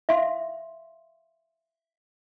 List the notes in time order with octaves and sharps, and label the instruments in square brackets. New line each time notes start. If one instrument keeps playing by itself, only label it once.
[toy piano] E5 F5 C6